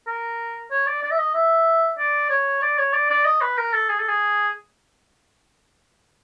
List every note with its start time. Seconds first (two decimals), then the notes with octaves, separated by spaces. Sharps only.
0.07 A#4
0.71 C#5
0.87 D5
1.03 D5
1.11 E5
1.18 D#5
1.35 E5
1.98 D5
2.30 C#5
2.62 D5
2.78 C#5
2.93 D5
3.10 D5
3.25 D#5
3.41 B4
3.57 A#4
3.74 A4
3.90 G#4
3.99 A4
4.09 G#4